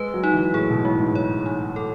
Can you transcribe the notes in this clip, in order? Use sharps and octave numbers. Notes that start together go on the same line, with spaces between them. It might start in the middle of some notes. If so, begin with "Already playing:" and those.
Already playing: G#3 B4
F#3
D#4
E3
A2 G#4
B2
A2 G#3
G#2
C#5
D#4
A4